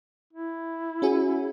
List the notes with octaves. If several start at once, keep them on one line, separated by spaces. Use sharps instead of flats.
E4
C#4 F#4 G#4